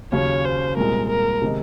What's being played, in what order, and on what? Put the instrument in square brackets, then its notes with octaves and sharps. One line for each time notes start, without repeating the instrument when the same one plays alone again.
[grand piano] D#2 C#3 F#3 C#4 [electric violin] C#5
[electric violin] C5
[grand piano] C2 A#2 G#3 [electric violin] A#4
[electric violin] A#4
[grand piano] C3 D#3 G#3 D#4